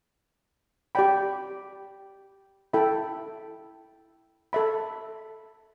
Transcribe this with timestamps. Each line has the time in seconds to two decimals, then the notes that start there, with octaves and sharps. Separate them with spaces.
0.95 G4 D5 G5 B5
2.73 E4 A4 E5 G5 B5
4.53 A4 E5 B5